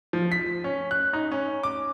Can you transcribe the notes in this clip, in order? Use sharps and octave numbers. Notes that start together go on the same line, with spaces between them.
F3
B6
C#4
F#6
D#4
C#4
D6